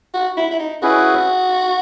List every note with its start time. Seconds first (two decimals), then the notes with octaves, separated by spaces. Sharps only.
0.14 F#4
0.37 E4
0.51 E4
0.59 D#4
0.82 C#4 E4 F#4 G#4 B4